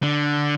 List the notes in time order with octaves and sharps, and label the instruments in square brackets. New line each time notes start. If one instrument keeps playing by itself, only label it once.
[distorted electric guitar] D3